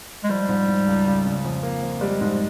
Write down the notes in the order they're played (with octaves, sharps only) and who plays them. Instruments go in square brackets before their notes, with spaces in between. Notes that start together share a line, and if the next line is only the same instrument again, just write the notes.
[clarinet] G#3
[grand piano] F3 [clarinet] G3
[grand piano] G#2
G#2
C#2
C#2
C#3
F2
A#3
F2
[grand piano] G3 [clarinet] G#3
[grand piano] G#2